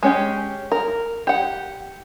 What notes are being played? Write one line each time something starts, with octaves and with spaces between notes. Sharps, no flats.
G#3 C#4 G4
A#4
G4 F#5